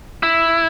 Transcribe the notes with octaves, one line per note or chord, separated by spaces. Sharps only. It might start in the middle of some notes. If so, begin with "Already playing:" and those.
E4